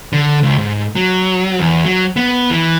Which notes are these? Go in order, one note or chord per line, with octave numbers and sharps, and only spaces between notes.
D3
C#2
G#2
F#3
E2
F#3
B3
E3